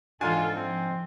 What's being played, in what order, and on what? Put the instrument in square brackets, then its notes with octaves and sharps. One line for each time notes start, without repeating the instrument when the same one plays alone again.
[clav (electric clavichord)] G#2 D4 [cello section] E3 A4 [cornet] F4 [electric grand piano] G#5
[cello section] F3 [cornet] C4